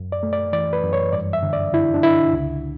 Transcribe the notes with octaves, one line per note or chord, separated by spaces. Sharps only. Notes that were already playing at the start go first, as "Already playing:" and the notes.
Already playing: F#2
D5
A3
D5
E3 D5
B4
F#2
C#5
G2 D5
E5
D3
D5
D3 E4
D4
D3 E4
C#2